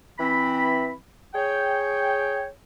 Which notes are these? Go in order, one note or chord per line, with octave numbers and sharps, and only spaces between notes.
E3 C4 B5
G#4 C#5 G5